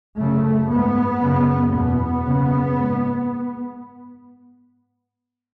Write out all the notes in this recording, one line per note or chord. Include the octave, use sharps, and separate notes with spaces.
F#2 C#3 A3
G#2 B3
F#2 C#3
E2 B2 B3
F#2 C#3
G#2